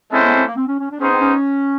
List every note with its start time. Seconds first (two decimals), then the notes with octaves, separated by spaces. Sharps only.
0.12 G#3 C4 C#4 E4 A4 C5
0.23 B3
0.34 C4
0.45 A#3
0.57 C4
0.68 C#4
0.79 C#4
0.91 D4
1.00 B3 C#4 D#4 G#4 C5
1.11 C4
1.20 C#4